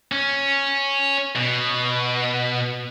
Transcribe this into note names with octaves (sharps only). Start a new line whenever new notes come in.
C#4
B2